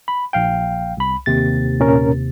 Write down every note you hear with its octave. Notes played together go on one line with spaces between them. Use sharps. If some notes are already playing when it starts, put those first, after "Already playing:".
B5
A#1 F5 G5
C2 B5
D#2 C3 A6
A#2 C#4 A#4